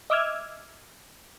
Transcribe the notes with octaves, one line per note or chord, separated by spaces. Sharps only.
D#5 E5 D6 E6 F6 G#6